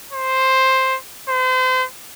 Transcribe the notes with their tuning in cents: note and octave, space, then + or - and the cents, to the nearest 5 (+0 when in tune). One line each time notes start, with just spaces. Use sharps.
C5 +5
C5 -35